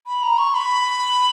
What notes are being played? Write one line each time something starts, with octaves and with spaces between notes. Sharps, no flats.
B5
A#5
C#6
B5